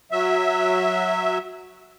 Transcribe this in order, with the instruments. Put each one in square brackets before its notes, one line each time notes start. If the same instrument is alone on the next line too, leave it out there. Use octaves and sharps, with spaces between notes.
[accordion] F#3 E5